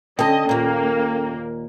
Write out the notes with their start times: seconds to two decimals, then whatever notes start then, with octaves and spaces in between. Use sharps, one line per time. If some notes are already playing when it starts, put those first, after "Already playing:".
0.19 D3 C#4 A4 D#5 G5 A5
0.49 D#2 A#2 A#3